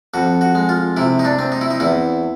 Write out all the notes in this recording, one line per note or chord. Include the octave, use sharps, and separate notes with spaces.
F2 F#4
F#4
G#3
F4
C3 E4
D#4
D4
C4
D#4
E4
D#4
E2 E4